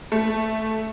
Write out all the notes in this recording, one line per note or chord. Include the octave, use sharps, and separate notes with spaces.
A3